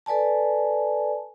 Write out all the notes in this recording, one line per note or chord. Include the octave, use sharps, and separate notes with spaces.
A4 B4 D5 G#5 A5